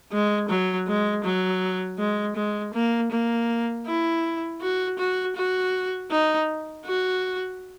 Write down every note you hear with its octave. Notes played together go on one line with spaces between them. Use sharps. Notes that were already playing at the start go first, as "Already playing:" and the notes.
G#3
F#3
G#3
F#3
G#3
G#3
A#3
A#3
E4
F#4
F#4
F#4
D#4
F#4